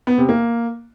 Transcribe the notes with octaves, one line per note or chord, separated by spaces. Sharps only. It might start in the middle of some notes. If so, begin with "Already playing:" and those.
B3
C3
A#3